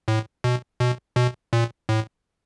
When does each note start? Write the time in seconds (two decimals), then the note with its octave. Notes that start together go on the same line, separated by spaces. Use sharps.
0.08 A2
0.44 B2
0.80 B2
1.16 B2
1.53 A#2
1.89 A2